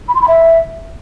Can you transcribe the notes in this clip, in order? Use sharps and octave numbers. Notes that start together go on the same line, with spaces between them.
B5
C6
B5
E5